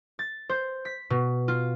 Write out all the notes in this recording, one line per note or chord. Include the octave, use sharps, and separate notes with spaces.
A6
C5
B6
B2
F4